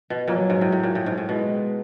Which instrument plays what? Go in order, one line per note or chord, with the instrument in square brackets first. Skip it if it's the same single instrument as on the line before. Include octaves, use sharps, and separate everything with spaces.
[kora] B2
[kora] A#2 [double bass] F#3
[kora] G#2
A2
A2
A#2
A2
G#2
A2
[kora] B2 [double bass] G#3